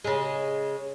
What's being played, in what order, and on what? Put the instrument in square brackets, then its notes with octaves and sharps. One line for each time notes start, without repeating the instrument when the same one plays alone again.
[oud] C#3 G#3